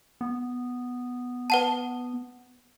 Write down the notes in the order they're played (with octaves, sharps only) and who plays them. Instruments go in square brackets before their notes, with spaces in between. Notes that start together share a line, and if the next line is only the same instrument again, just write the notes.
[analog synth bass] B3
[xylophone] B4 F#5 A5